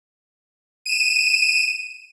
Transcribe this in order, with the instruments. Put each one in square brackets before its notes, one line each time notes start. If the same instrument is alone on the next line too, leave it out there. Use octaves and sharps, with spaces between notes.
[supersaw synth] D#7 E7